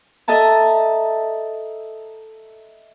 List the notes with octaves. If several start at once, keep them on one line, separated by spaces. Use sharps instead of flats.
A4 D#5 E5 A5 A#5